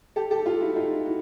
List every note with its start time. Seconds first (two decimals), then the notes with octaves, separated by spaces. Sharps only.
0.16 G4 A4
0.31 G4 A4
0.46 F4 G4
0.61 E4 F#4
0.76 D#4 F4
1.06 E4 F#4